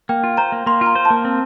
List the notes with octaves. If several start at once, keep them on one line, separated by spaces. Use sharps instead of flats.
A#3 G5
F4
C5 A#5
A#3
A#3 C6
F4 A#5
C5
A5
A#3
C4